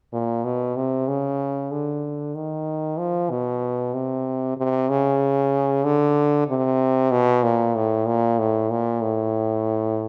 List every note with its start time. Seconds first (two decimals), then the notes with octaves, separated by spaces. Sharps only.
0.13 A#2
0.44 B2
0.76 C3
1.08 C#3
1.71 D3
2.35 D#3
2.98 F3
3.30 B2
3.94 C3
4.57 C3
4.89 C#3
5.84 D3
6.48 C3
7.11 B2
7.43 A#2
7.75 A2
8.06 A#2
8.39 A2
8.70 A#2
9.02 A2